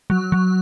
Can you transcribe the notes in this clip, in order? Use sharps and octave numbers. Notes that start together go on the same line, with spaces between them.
F#3
F#3